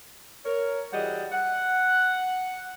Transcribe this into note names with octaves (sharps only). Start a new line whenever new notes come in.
A#4 C#5
E3 G3 F#4 G#4 D#5 F#5
F#5